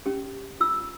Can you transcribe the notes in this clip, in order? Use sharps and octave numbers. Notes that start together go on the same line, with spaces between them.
C#4 G4
F4 E6